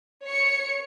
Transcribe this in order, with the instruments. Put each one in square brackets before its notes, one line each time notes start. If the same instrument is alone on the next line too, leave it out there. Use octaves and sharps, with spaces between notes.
[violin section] C#5 C#7